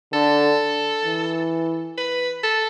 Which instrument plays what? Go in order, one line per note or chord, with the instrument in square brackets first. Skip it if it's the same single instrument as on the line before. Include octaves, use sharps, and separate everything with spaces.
[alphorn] D3 [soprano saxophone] A4
[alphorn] E3
[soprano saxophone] B4
A4